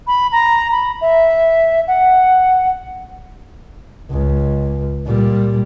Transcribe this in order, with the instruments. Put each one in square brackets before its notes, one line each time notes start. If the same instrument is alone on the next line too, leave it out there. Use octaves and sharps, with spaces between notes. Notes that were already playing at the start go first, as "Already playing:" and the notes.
[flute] B5
A#5
B5
E5
F#5
[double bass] C#2
A#2 G3